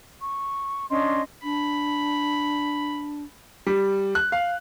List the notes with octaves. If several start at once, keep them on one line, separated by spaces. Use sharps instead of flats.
C#6
C#4 D4 D#5 C6
D4 B5
G3
F#6
F5